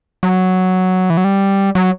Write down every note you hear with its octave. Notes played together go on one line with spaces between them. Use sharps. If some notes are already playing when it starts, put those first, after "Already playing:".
F#3
E3
F#3
G3
F#3